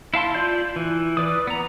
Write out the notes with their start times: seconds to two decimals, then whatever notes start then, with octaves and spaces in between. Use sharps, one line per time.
0.14 E4 F5 A5 C6
0.35 F4 D5 G6
0.76 E3
1.17 B4 D5 D#6
1.47 B3 A#5